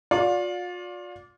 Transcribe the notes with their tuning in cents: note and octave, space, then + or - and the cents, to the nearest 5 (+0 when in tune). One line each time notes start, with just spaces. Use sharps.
F4 +40 D5 -15 F5 +30